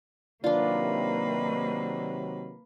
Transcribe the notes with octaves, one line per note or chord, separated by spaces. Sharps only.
C3 D#3 F#3 A#3 D4 F4 B4 D5